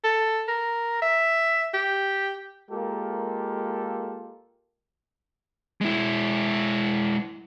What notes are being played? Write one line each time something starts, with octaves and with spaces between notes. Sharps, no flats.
A4
A#4
E5
G4
G#3 A#3 F4 G4 A4 A#4
G#3 E4